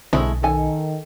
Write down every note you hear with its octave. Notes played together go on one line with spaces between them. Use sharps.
B1 D3 G#3 A3 C4 E4
D#3 A4 G#5